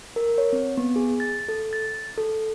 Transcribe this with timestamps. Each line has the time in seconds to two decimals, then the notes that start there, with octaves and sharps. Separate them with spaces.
0.16 A#4
0.38 C#5
0.53 C4
0.77 B3
0.96 G#4
1.20 A6
1.49 A4
1.73 A6
2.18 A4